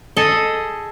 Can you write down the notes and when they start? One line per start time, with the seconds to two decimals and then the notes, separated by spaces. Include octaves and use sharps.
0.16 G#4 A4 D#5